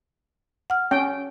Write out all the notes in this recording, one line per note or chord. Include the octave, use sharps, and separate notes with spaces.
F#5 F6
C#4 G5